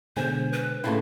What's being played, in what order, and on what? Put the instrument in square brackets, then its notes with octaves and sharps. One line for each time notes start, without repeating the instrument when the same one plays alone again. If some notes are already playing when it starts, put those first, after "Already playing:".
[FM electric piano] B2 D3 G#3 [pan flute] C5 [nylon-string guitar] G#5
[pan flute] B4
[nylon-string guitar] A2 C#3 E4 [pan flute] A#3 [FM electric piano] G5 A5 C6